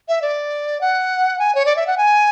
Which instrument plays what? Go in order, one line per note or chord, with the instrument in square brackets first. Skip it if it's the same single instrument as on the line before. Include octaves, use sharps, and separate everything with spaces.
[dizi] E5
D5
F#5
G#5
C#5
D5
E5
F#5
G#5